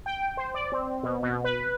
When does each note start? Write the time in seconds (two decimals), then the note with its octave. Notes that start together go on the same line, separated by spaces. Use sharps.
0.06 G5
0.37 C5
0.54 D5
0.72 C4
1.03 B2
1.23 B2
1.44 B4